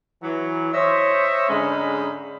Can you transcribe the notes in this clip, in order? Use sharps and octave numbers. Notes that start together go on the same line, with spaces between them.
E3 F#3
C5 C#5 D#5 E5
G#2 D3 G#3 C#4 D#4 B5